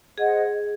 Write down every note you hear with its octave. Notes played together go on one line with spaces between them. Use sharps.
G#4 C5 D#5 F#5